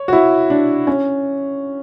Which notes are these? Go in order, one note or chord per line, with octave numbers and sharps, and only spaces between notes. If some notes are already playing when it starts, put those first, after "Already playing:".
Already playing: C#5
F#4
E4
D4
C#4